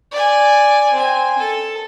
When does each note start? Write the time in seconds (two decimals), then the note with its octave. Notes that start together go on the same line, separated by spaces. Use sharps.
0.11 D5 G#5
0.93 C4 G#5
1.38 A4